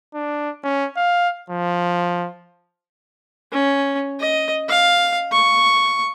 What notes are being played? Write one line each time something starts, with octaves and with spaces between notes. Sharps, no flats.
D4
C#4
F5
F3
C#4
D#5
F5
C#6